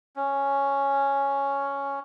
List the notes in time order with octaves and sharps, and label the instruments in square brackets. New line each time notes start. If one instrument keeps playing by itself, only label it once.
[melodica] C#4